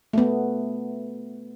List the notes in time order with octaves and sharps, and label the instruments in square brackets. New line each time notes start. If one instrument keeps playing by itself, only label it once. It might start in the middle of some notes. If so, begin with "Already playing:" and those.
[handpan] A3 B3